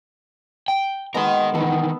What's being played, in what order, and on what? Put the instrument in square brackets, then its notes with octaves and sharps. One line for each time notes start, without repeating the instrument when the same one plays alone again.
[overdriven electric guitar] G5
[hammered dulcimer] G#3 B3 [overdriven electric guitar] A#4 D#5
[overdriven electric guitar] D#3 E3 [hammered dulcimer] B3 A4